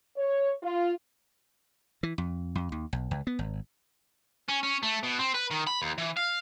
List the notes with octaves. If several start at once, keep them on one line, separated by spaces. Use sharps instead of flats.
C#5
F4
E3
F2
F2
D#2
B1
C#2
B3
G#1
C#4
C#4
A3
B2
C4
B4
D#3
B5
D#2
E3
F5